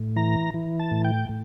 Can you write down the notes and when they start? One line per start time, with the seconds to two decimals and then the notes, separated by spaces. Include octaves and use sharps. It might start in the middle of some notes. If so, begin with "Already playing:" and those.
Already playing: A2
0.16 E3 A#5
0.54 E3
0.79 A5
0.91 A2
1.04 G5
1.29 A2